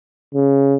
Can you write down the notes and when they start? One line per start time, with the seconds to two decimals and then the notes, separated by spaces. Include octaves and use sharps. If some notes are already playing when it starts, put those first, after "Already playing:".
0.35 C#3